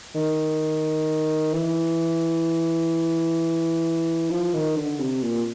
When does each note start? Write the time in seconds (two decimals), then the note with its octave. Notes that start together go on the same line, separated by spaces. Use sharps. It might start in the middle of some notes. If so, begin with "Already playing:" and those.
0.15 D#3
1.53 E3
4.30 F3
4.54 D#3
4.76 D3
4.99 C3
5.23 A#2